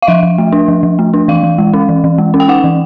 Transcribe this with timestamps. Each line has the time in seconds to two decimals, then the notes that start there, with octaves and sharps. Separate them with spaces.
0.02 F5
0.07 F3 E5
0.23 F3
0.38 A3
0.52 D4
0.68 F3
0.83 F3
0.99 A3
1.14 D4
1.28 E3 F5
1.43 E3
1.58 G#3
1.74 C#4
1.89 E3
2.04 E3
2.18 G#3
2.34 C#4
2.40 G5
2.48 D#4 F#5
2.64 E3